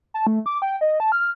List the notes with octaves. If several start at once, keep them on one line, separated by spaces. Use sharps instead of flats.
A5
A3
D6
G5
D#5
A5
F6